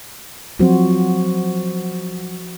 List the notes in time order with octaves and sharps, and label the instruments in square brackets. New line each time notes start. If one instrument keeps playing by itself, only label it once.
[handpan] F3 F#4 C5 [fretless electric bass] F#3 C4